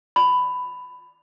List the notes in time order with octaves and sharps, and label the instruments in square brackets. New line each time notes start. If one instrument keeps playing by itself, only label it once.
[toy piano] B5